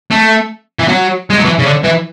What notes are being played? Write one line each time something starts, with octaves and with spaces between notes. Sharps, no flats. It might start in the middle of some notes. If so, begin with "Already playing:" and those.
A3
E3
F#3
G#3
F#3
E3
C#3
D3
E3